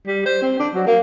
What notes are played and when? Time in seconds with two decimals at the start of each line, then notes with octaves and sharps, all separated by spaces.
0.06 G3
0.25 C5
0.42 C4
0.59 D4
0.74 F#3
0.87 A#3